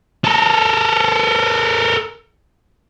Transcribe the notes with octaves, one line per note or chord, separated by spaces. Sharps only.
A4 A#4